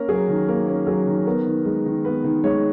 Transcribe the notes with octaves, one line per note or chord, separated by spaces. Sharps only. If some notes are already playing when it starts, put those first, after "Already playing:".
Already playing: A#3 C#4 A#4
F#3 G#4
D#3
A#3 A#4
C#4
F#3 G#4
D#3
B3 A#4
D#3
G#3
D#3
B3 B4
D#3
G#3 C#5